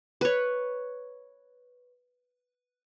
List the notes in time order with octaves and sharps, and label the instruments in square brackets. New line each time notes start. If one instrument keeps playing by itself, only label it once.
[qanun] B4 C#5